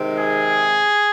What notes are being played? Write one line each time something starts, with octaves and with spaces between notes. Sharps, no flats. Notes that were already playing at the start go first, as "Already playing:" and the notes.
Already playing: C3 D#3 G#3 C4
G#4